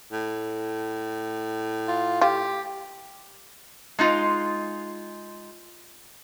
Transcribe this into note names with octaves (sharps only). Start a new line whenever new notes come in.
A2
F4
F4 G4
G#3 D#4 F4